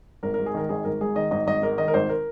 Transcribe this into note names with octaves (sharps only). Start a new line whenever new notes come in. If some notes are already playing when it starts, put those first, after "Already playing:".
G#1 A#4
G#2 A#4
G#4
D#3 A#4
G#1 G#4
G#1 A#4
G#2 G#4
D#3 D#5
G#1 D#5
G#1 D#5
G#2 A#4
D#3 D#5
A#4
G#1 C5
A#4